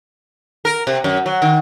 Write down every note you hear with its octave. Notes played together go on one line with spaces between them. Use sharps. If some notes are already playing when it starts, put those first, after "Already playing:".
A#4
C3
F#2
F#3
D#3